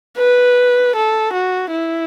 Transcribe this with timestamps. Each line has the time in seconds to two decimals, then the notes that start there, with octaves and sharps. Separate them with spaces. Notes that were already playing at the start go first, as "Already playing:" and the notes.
0.18 B4
0.96 A4
1.33 F#4
1.72 E4